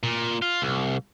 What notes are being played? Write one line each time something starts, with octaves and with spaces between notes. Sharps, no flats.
A#2
F4
C2